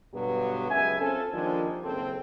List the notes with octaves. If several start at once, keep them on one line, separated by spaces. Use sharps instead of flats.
G2 B2 D3 F#3 B3 G4
C#2 F#2 B3 E5 G#5
C4 C#4 F4 A4
D#3 F3 G3 G#3 A#3 D4
F#1 C4 A4